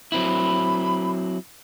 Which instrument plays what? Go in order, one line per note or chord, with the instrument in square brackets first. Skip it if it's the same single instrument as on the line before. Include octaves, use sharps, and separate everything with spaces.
[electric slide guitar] F#3 C4 E4 [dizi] B5